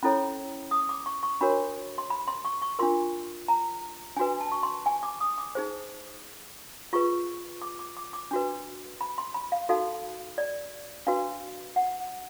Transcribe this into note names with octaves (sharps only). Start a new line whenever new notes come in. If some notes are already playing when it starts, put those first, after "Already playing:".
C#4 E4 A4 C#5 B5
D#6
D6
C#6
C#6
D4 F#4 A#4 C#5 B5
C6
B5
C6
C#6
C#6
D4 F4 A#4 C6
A#5
D4 F#4 B4 G#5
A5
C#6
C6
G#5
D6
D#6
D6
D#4 G#4 C5
F4 G#4 B4 C#6
D6
D6
D6
D6
D4 F#4 B4
B5
C6
B5
F5
D#4 F#4 A4 F5
D5
D4 F#4 B4 F5
F#5